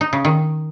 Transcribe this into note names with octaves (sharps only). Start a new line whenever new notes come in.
D#4
C#3
D#3